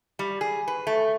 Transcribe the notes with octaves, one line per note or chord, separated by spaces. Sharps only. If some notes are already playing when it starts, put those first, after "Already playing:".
G3
G#4
B4
A3